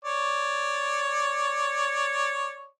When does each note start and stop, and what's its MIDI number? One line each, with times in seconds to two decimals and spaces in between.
0.05 2.67 73
0.05 2.67 74